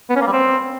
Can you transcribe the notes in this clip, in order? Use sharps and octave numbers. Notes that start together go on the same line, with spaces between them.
B3
C#4
A#3
G3
C4